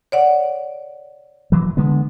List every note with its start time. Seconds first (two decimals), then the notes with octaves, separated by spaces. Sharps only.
0.12 C#5 D5 F#5
1.52 E3 F#3
1.77 D3 G#3 B3